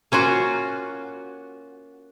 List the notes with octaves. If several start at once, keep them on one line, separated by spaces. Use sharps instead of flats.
A#3 C#4 F4 F#4